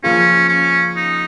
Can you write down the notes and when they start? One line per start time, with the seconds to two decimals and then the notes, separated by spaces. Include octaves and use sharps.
0.03 C#3 F3 A#3 C#4 F4
0.49 C#4
0.96 D#4